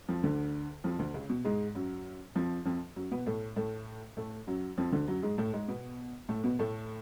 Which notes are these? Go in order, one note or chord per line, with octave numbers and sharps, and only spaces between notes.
F2 F3
D2 D3
F2 F3
D2 D3
C#2 C#3
B2
G#2 G#3
F#2 F#3
F2 F3
F2 F3
F#2 F#3
B2 B3
A2 A3
A2 A3
A2 A3
F#2 F#3
F2 F3
D2 D3
F#2 F#3
G#2 G#3
A2 A3
G#2 G#3
B2 B3
A2 A3
B2 B3
A2 A3